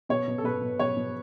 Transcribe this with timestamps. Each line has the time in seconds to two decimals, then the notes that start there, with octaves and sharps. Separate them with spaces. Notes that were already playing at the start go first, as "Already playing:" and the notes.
0.09 B2 C#5
0.28 B2
0.38 A4
0.44 B2 B4
0.61 B2
0.79 B2 C#5
0.97 B2